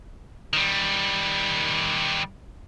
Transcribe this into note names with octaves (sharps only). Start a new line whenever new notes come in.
D#3 G3